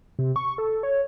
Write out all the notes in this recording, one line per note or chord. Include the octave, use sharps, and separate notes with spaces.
C3
C#6
A4
C#5